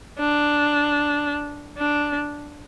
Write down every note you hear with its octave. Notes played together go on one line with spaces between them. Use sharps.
D4
D4